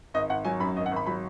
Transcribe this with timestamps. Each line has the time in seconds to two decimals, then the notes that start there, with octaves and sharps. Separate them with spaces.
0.14 G#1 D#5
0.30 G#1 F#5
0.45 F#3 G#5
0.60 F#2 B5
0.76 G#1 D#5
0.86 F#5
0.92 G#1 B5
1.06 F#3 B5